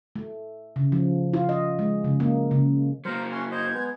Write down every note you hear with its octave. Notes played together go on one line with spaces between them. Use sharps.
A3
C#3
F3
F4
D#5
G#3
C#3
A#3
C#3
F#3 A#3 A#4 C5
C#4 E5 C6 F#6
C5 D#5 A#5 G6 G#6
G#3 B3